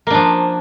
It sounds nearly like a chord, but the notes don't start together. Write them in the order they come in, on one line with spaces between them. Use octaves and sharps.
A#3 D4 F3